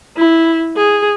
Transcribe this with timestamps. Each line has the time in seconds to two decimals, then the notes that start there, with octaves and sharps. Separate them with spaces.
0.17 E4
0.76 G#4